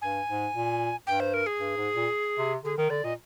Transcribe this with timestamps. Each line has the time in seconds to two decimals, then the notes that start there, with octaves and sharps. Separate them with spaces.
0.02 G2 G#5
0.28 G#2
0.55 A#2
1.07 G2 G5
1.20 C5
1.34 A#4
1.46 G#4
1.59 G2
1.76 G#2
1.95 A#2
2.38 C3
2.64 D3 G#4
2.77 D#3 A#4
2.90 D3 D5
3.04 A#2 D#5